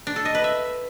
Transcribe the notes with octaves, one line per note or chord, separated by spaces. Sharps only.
D4
A4
D#5
B4
E5